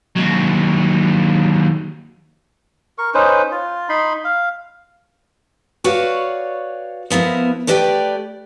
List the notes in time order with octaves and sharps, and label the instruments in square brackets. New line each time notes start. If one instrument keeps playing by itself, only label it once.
[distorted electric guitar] D#2 F#3
[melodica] A#4 C#6
C#4 D#4 B4 C5
F4
D#4 B5 C6
F5
[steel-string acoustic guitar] F#4 B4 C#5 D5 F5
F3 B3 E4 A#4
A3 G4 B4 D5 E5 G5